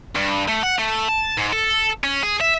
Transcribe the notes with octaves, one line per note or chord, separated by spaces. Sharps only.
G2
A3
F#5
A3
A5
G#2
A4
C#4
G#4
E5